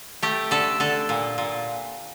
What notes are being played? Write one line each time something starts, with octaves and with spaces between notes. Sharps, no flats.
A3 G4
D3 A4
D3 A4
A#2
A#2